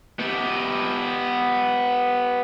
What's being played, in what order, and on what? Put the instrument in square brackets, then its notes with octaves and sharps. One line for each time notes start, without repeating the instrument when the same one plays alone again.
[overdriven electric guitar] B3 G4